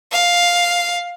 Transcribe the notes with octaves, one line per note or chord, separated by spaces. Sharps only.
F5